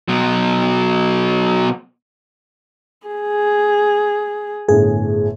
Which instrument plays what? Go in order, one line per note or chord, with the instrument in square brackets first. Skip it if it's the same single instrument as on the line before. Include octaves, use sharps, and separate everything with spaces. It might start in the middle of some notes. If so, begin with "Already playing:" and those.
[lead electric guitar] B2 F#3
[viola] G#4
[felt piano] G1 A2 [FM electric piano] G#4